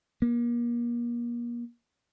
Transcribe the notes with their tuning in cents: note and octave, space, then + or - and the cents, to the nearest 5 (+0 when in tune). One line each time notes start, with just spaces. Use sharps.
A#3 +35